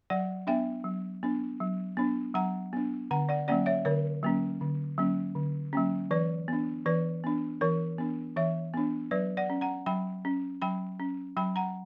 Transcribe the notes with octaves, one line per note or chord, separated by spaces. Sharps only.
F#3 D5 F#5
B3 D4 E5 G5
F#3
B3 D4
F#3
B3 D4
F#3 F#5 A#5
B3 D4
D3 F#5 A#5
D5 F#5
F#3 A#3 C#4 D5 F#5
C#5 E5
D3 A#4 C#5
F#3 A#3 C#4
D3
F#3 A#3 C#4
D3
F#3 A#3 C#4
E3 B4 D5
B3 D4
E3 B4 D5
B3 D4
E3 A#4 C#5
B3 D4
E3 C#5 E5
B3 D4
F#3 B4 D5
D5 F#5
C#4
F#5 A#5
F#3 G5 B5
C#4
F#3 G5 B5
C#4
F#3 G5 B5
F#5 A#5